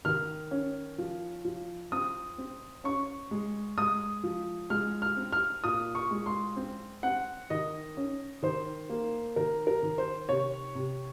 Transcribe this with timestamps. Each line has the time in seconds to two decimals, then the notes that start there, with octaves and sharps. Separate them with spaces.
0.05 D#3 F6
0.51 C#4
0.98 F3
1.45 F3
1.92 C4 D#6
2.38 C4
2.84 C#4 C#6
3.31 G#3
3.78 G#3 D#6
4.24 F3
4.70 G#3 F6
5.02 F6
5.17 C4
5.33 F6
5.64 A#2 D#6
5.95 C#6
6.11 G#3
6.26 C6
6.56 C4
7.03 C4 F#5
7.50 D#3 D#5
7.97 C#4
8.43 D#3 C5
8.89 A#3
9.36 D#3 A#4
9.67 A#4
9.83 D#3
9.98 C5
10.29 C3 C#5
10.75 C3